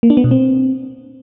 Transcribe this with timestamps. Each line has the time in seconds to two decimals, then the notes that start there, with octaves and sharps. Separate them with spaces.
0.03 A#3
0.10 D4
0.17 B3
0.24 B2
0.31 C4